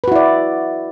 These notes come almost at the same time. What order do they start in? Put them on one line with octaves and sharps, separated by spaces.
B4 F#4 E4 D5